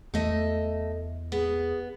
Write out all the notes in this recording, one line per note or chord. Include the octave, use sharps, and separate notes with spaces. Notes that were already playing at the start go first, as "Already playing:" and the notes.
E2 A3 D#5 E5
B3 G#4